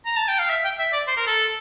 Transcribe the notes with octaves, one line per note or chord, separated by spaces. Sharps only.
A#5
A5
G5
F5
E5
G5
E5
D5
C5
A#4
A4